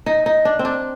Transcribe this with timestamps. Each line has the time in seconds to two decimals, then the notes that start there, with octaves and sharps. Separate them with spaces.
0.06 D#4
0.26 D#4
0.45 D4
0.59 C4
0.65 D4